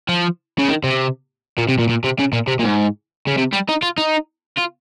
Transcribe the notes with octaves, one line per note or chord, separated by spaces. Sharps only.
F3
C#3
D#3
C3
A#2
C3
A#2
A#2
C3
C#3
A#2
C3
A#2
G#2
C#3
C3
G3
D#4
F4
D#4
F4